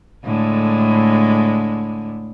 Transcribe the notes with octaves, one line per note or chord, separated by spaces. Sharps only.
A2 D3 G#3